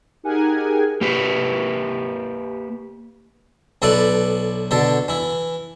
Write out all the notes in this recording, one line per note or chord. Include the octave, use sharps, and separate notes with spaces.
D#4 G4 G#4 A#4 F#5 G#5
A#3 G4 B4
B1 E4 A4 B4 D5
B2 D3 A4
E3 E4